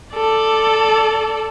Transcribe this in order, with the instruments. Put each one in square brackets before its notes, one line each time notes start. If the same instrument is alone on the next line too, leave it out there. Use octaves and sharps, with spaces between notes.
[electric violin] A4 D5